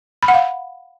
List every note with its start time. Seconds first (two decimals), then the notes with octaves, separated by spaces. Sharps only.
0.23 B5
0.28 F#5
0.34 F5